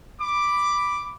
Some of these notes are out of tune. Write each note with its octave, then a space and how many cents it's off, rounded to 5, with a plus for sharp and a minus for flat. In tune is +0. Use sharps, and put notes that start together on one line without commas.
B5 +0 D6 +0